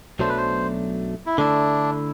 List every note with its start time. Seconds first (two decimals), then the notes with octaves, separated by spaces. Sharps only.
0.19 B1 B2 F#3 A3 D4 C5
0.29 B4
0.37 C5
1.26 E4
1.37 D3 A3 D4 E4